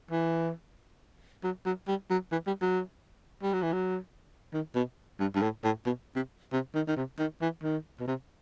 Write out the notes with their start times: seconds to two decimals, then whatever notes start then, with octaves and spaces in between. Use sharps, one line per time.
0.11 E3
1.44 F#3
1.66 F#3
1.88 G3
2.10 F#3
2.32 E3
2.47 G3
2.62 F#3
3.43 G3
3.53 F#3
3.63 E3
3.73 F#3
4.54 D#3
4.75 B2
5.20 G2
5.35 G2
5.42 A2
5.64 A2
5.86 B2
6.16 C3
6.53 C3
6.75 D#3
6.88 D#3
6.97 C3
7.19 D#3
7.41 E3
7.63 D#3
8.00 B2
8.08 C3